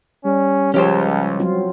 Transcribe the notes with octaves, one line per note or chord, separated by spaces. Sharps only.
G3 C#4
C#2 F3 C#4 G4 C5 C#5
F#3 C4 F4